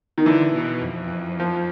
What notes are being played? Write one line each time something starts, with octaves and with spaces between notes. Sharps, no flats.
D#3
D3 E3
B2
F2
F3